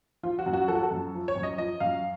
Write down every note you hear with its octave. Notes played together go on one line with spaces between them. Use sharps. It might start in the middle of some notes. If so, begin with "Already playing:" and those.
F3 F4
F#4
F#2
F#4
F3 A4
F#4
A4
F#2
F3
C#5
F#2
D#5
F3 D#5
F#2 F5